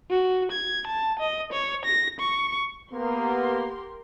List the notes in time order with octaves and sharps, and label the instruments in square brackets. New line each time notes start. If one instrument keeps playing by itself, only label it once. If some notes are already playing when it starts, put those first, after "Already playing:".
[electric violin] F#4
G#6
A5
D#5
C#5
A#6
C#6
[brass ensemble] A#3 B3 [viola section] G4 A#4 C6